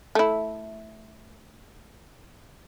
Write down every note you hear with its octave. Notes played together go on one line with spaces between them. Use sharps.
A3 E4